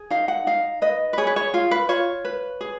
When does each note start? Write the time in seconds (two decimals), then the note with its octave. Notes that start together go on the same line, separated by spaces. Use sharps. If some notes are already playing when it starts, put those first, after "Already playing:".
Already playing: G#4
0.10 D#4 F5
0.28 F#5
0.47 D#4 F5
0.82 B4 D#5
1.13 B4
1.18 G#4 C#5
1.27 B4
1.36 C#5
1.54 F4 F5
1.71 B4
1.89 F4 C#5
2.25 B4
2.61 G#4